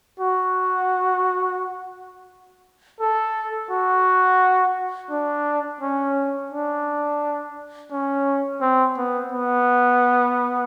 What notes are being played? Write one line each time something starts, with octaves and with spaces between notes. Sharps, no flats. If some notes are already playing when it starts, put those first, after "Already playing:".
F#4
A4
F#4
D4
C#4
D4
C#4
C4
B3
B3